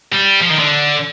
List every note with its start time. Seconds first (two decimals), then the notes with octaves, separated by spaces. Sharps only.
0.12 G3
0.41 F3
0.50 D#3
0.59 D3